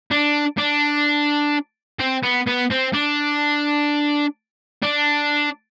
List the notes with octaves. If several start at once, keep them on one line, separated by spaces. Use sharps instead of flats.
D4
D4
C4
B3
B3
C4
D4
D4